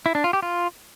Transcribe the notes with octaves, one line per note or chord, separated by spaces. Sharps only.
E4
D4
F4
G4
F4